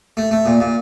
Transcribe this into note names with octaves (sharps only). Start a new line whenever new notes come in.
A3
A3
A#2
A#2